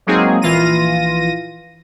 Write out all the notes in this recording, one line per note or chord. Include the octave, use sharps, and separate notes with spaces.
F#3 G#3 A#3 C4 D#4 G#4
A#1 E3 F4 A#6 D#7